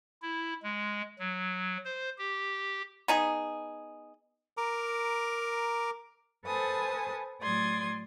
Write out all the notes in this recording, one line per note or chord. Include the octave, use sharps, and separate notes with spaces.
E4
G#3
F#3
C5
G4
B3 D#4 G#4
A#4 A#5 D6
A4 B4 C5 G#5 A5 D#6
A2 F#3 D5 C6 D#6 G#6